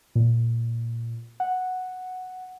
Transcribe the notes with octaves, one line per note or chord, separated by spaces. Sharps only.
A#2
F#5